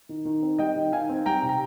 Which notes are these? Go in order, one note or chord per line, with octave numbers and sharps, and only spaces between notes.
D#3
D#3
C4
G3 D#5 G5
D#3
D#3 F5 G#5
C4
G3 G5 A#5
C3
A#5